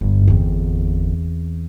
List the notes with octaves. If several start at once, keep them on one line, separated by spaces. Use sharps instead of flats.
G1 G2
E2 C4